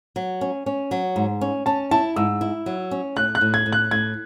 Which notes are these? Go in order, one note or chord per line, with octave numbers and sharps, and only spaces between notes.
F#3
C#4
C#4
F#3
G#2
C#4
C#4 A5
E4 A5
G#2 E6
E4
F#3
C#4
A2 F#6
F#6
A2
G#6
A2
F#6
A2 G#6